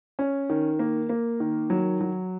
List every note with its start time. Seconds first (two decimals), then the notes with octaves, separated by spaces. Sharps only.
0.19 C#4
0.50 D#3
0.79 A#3
1.09 A#3
1.40 D#3
1.70 F#3
2.01 F#3